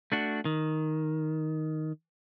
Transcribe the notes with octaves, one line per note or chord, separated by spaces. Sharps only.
A3 D4 F#4
D#3